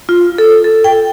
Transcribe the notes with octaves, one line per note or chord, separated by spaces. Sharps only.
F4
A4
A4
G5